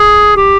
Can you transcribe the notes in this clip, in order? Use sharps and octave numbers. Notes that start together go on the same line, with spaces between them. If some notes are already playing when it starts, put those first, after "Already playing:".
Already playing: G#4
G4